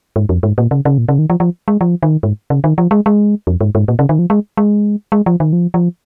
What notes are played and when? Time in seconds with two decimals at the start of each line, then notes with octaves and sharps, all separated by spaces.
0.16 G#2
0.29 F2
0.43 G#2
0.58 A#2
0.71 C#3
0.85 C#3
0.98 A#2
1.09 C#3
1.19 D#3
1.30 F3
1.40 F3
1.68 G#3
1.81 F3
2.03 D#3
2.23 G#2
2.50 C#3
2.64 D#3
2.78 F3
2.91 G#3
3.06 G#3
3.47 F2
3.61 G#2
3.75 G#2
3.88 A#2
3.99 C#3
4.09 D#3
4.19 F3
4.30 G#3
4.57 G#3
5.12 G#3
5.26 F3
5.40 D#3
5.53 F3
5.74 F3